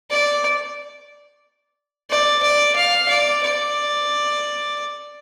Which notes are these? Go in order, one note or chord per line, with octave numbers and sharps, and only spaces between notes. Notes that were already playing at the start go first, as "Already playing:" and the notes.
D5
D5
D5
F5
D5
D5